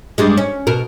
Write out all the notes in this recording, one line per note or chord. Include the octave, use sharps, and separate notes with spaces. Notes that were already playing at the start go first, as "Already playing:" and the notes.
G2 G3 G#3
C#4
B2 A#4